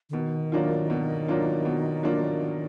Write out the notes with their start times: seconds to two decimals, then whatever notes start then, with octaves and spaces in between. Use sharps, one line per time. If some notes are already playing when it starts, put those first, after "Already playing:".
0.10 D3
0.13 B2 D#3
0.52 F#3 A#3 D4 F4
0.90 B2
1.28 F#3 A#3 D4 F4
1.65 B2
2.03 F#3 A#3 D4 F4